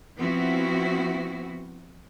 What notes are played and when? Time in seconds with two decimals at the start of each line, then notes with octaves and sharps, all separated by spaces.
0.17 F3 B3 C4 E4 F#4